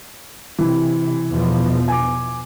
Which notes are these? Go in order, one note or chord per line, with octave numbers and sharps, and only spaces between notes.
C3 E3
E2 B2 F3
G#5 D6